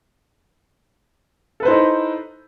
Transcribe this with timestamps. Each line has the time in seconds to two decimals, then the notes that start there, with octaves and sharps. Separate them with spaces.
1.60 A4
1.63 B4
1.65 C5
1.68 E4
1.71 D#4